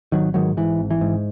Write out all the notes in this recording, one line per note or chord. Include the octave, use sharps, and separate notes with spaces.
G#1 D#3 F#3
G#2 D#3 F#3
G#2 E3
G#1
E3
G#2